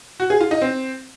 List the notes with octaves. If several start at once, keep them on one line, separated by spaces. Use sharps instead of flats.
F#4
G#4
F4
D#4
C4